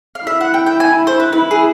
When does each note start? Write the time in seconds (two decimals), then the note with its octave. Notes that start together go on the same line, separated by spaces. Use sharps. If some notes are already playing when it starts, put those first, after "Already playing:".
0.15 F5
0.27 E4 E5
0.41 F#5
0.54 G5
0.66 G5
0.80 G#5
1.07 C5
1.20 B4
1.33 E4 B4
1.51 G#4